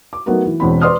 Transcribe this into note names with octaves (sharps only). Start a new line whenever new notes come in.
D6
F#3 A3 B3 D#4 F#4 A#4
E3
E1 E2 C4 B5
B4 D5 C6 D#6 F6